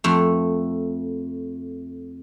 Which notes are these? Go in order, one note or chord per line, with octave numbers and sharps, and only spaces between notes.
F2 A3